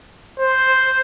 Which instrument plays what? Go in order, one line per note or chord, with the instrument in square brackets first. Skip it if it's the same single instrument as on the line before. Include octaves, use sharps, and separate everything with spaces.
[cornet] C5